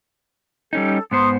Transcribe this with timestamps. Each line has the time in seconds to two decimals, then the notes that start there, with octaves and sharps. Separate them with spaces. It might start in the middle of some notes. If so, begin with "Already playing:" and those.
0.73 G3 C#4 D#4 A4
1.11 G#2 B3 C5 A#5 C6 D#6